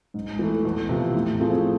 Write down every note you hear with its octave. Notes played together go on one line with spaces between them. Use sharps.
G#2
E3 A3
E2
C3 F3
A2
F3 A3 C4 G#4